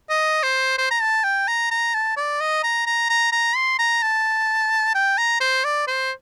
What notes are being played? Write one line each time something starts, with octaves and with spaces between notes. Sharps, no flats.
D#5
C5
C5
A#5
A5
G5
A#5
A#5
A5
D5
D#5
A#5
A#5
A#5
A#5
C6
A#5
A5
G5
A#5
C5
D5
C5